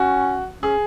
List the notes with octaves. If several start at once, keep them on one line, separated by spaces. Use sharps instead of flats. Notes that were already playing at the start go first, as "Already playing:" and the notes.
Already playing: C#4 F#4
C#4 G#4